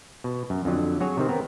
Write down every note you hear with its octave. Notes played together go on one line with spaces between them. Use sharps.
B2
F#2
F2 D3 F#3
F#3 F#4 G#4 C#5
C3 D#3 C4
B3 C4 A#4